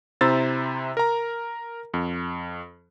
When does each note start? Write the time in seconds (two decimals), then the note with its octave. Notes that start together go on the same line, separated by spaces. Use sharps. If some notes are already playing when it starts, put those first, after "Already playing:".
0.21 C3 E4 C5 A#5 E6 A6
0.97 A#4 A#5
1.94 F2